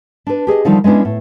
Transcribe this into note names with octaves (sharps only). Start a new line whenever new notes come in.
D4 B4
G4 G#4 D5 D#5
D3 D#3 F3 G3 D#4
G#3 B3 C#4 D4 E4
A2